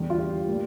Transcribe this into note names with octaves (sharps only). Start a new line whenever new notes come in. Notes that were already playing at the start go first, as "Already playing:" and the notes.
Already playing: E2 D3 G3
F4
G4
A2 G3 A#3